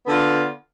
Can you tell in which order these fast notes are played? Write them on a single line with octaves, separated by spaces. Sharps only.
B3 D3 F4